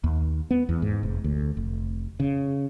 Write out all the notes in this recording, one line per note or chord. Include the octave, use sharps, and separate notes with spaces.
D#2
B3
E2
G#2
F1
D2
F1
C#3